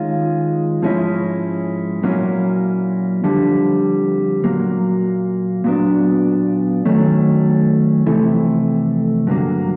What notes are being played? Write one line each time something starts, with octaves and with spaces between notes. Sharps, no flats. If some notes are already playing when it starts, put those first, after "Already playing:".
Already playing: D#3 G#3 C#4 F4
G#2 F3 G#3 C#4 E4
A#2 F#3 A#3 C#4 E4
F2 D3 G3
A#2 F#3 A#3
A#2 F#3 B3 D4
D#3 F#3 A3 C#4
F2 C3 E3 A3
G2 D3 F#3 A#3